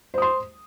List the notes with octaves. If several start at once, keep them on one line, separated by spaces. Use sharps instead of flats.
C5 C6 D#6